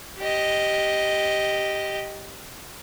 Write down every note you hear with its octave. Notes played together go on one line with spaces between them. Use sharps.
G4 D#5